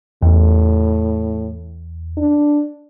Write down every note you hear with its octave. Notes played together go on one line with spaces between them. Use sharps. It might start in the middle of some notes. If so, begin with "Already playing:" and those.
E2 A2
D4